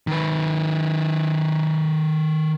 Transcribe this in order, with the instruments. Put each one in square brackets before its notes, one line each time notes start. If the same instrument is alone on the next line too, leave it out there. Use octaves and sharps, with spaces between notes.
[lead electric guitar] D#3 B4